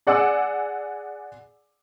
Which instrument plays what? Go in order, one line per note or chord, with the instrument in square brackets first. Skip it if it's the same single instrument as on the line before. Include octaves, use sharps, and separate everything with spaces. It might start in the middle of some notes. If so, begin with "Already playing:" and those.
[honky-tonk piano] G#4 D5 F#5 G#5 D6 E6